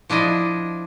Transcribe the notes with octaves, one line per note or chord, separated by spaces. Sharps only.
F3 D4 E4 D#5